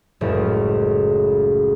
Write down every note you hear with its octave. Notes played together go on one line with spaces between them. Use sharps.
F#1 C#2 A2 E7